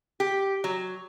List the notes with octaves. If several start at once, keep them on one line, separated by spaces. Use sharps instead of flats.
G4
F#3